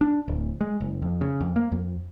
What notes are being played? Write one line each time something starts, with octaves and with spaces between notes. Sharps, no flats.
D4
D1
G#3
F#1
F2
C#3
F2
A#3
F2